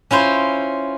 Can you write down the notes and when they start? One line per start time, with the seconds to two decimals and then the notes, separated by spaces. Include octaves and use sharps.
0.11 C#4 E4 F4 C5